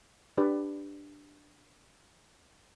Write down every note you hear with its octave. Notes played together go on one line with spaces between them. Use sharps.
D4 G4 B4 D5